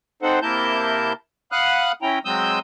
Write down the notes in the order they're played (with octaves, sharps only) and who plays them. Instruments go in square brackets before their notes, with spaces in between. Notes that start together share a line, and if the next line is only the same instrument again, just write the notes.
[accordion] C4 D#4 A4 C5 F#5
C3 A#3 E4 A#4 A5 G6
F5 F#5 B5 D#6 F6 F#6
C#4 E4 G5 A#5
F#3 G#3 C4 D#6 E6 G6